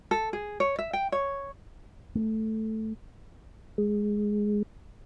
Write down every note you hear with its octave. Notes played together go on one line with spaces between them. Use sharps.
A4
G#4
C#5
E5
G5
C#5
A3
G#3